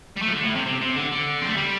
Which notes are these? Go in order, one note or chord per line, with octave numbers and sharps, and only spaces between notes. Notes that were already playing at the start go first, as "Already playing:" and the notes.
G3
A3
F3
D3
A2
C3
C3
C3
D3
D3
C4
A3
G3